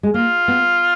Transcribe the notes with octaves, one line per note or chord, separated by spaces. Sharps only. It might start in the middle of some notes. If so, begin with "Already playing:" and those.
G#3
A#3 F4
B3